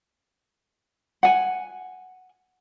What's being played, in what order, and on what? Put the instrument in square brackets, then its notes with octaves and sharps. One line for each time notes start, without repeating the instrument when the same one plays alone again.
[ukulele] F#5 G#5